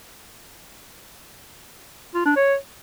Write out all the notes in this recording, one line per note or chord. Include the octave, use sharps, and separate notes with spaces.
F4
D4
C#5